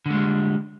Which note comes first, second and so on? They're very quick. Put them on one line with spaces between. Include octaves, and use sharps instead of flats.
D3 G#3 G3